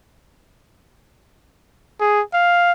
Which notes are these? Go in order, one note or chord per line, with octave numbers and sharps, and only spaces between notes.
G#4
F5